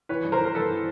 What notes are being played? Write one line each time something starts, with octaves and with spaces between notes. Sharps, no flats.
E3 B4 C#5
G2
A#4 C5
E3
A#4
G2 A4 B4
E3